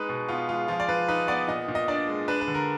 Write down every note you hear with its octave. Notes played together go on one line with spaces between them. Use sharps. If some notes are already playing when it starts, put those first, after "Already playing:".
Already playing: G#3 D#4 B4
B2
B3 F4
G#3 F4
F3 F4
D5
F3 B4
D#4 B4
B3 D5
A#2 D#5
A#2
D#5
D4 D5
G#3
D4 B4
B4
D3
A#4